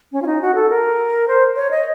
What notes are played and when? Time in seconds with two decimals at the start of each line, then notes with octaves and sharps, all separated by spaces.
0.12 C#4
0.22 F4
0.26 D#4
0.41 F#4
0.55 A4
0.70 A#4
1.28 C5
1.56 C#5
1.71 D#5